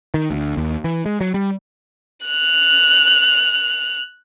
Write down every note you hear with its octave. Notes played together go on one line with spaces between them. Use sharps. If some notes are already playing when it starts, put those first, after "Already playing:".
D#3
D2
D#2
E3
G#3
F#3
G3
F#6 F7